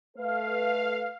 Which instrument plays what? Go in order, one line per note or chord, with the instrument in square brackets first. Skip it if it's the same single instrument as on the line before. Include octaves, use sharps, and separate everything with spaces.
[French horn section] A3 A4 B4 [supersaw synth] F5